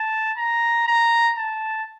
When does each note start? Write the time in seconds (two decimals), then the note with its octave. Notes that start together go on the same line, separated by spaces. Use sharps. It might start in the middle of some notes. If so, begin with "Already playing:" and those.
Already playing: A5
0.37 A#5
0.87 A#5
1.38 A5